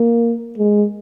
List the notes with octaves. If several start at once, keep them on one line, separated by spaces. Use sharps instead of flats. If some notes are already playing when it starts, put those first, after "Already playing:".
Already playing: A#3
G#3